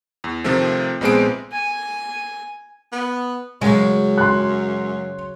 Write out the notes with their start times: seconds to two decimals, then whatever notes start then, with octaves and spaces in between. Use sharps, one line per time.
0.24 E2
0.44 C3 D#3 F3 A3 C4
1.01 A#1 G#3 B3 C4 G#4 D7
1.52 G#5
2.92 B3
3.62 F#2 C#3 F#3 G#3
4.18 C6 F#6